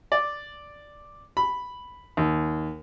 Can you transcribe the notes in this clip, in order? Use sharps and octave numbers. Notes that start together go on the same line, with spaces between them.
D5
B5
D#2